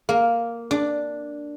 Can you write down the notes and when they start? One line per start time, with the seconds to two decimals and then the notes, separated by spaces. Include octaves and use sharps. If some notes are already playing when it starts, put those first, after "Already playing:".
0.09 A#3
0.71 D4